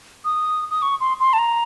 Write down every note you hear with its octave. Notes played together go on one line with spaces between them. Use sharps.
D#6
D#6
C#6
C6
C6
A5
A#5